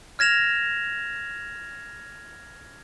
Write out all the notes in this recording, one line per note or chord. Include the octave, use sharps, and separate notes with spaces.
F6 G#6 A#6 E7 F7